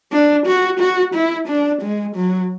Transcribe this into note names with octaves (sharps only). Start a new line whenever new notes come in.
D4
F#4
F#4
E4
D4
G#3
F#3